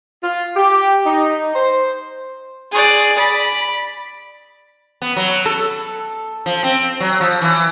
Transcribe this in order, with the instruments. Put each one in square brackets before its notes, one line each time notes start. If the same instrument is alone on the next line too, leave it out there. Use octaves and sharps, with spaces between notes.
[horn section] F4
G4
D#4
C5
[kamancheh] G#4 D5
D5 B5
[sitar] B3
F#3
A4
F3
C4
F#3
F3
E3